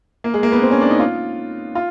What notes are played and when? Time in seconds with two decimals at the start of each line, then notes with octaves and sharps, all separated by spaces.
0.24 A#3
0.34 G#3
0.43 A#3
0.52 B3
0.62 C4
0.71 C#4
0.81 D4
0.90 D#4
1.00 F4
1.75 F4